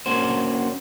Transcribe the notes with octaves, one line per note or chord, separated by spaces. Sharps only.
A#3 C#4 D4 F#4 C5